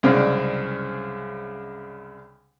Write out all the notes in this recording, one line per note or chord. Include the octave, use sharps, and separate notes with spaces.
C2 F#2 C#3 G#3 C4 D4